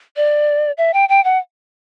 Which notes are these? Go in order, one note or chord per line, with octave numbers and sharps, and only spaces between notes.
D5
E5
G5
G5
F#5